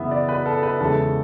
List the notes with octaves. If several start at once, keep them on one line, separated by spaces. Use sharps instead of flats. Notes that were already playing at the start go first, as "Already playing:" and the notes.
Already playing: F#2 C#3 E3 B3 E5
D5
B4
A4
B4
E2 C#3 E3 G#3 A4